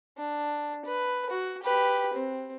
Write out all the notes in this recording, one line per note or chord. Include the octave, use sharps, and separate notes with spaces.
D4
B4
F#4
G4 B4
C4